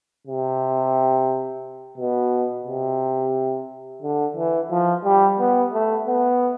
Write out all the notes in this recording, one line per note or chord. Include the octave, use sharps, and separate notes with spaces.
C3
B2
C3
D3
E3
F3
G3
B3
A3
B3